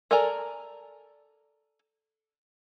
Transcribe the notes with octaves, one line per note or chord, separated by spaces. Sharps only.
A4 A#4 D5 G#5 A#5